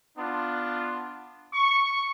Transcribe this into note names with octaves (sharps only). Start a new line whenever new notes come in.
B3 D4 F4
C#6